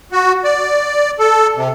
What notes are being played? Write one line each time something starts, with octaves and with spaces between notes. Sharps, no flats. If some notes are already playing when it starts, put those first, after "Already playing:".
F#4
D5
A4
C3